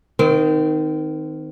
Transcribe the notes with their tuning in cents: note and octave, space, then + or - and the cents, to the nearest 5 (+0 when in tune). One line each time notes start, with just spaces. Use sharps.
D#3 +0 C4 -30